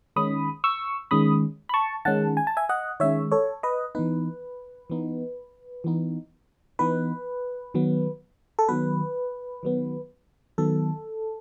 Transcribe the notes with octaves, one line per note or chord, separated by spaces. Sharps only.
D#3 G#3 C#4 B5 D#6
C#6 E6
D#3 G#3 C#4 B5 D#6
B5
A5 C#6
D#3 G#3 C#4 F#5 A5
G#5
A5
E5 G#5
D#5 F#5
D#3 G#3 C#4 C#5 E5
A4 C#5
B4 D#5
E3 B3 D#4 B4
E3 B3 D#4
E3 B3 D#4
E3 B3 D#4 B4
D#3 F#3 B3
A4
D#3 F#3 B3 B4
D#3 F#3 B3
D#3 F#3 B3 A4